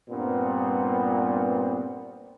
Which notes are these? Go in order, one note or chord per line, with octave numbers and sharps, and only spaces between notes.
G2 A#2 B3 C4